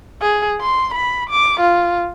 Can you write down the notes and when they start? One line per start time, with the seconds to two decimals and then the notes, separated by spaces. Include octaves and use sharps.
0.22 G#4
0.61 C6
0.94 B5
1.30 D6
1.61 F4